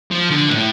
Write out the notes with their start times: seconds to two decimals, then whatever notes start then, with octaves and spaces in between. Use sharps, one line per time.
0.11 F3
0.30 D3
0.50 A2